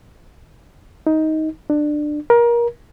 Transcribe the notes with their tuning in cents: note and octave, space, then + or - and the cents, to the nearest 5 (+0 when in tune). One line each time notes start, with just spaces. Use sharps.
D#4 +15
D4 +20
A#4 +25